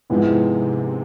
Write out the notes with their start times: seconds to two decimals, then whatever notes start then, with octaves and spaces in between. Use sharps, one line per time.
0.10 G#2 C3 F3 G#3 B3 E4